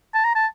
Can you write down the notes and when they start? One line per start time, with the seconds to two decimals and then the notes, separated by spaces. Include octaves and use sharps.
0.14 A5
0.24 A#5
0.35 A5